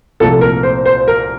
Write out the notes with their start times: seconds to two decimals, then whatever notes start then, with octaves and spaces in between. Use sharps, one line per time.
0.20 C2 A#2 F3 A3 A4
0.41 A#4
0.63 C5
0.86 C5
1.08 A#4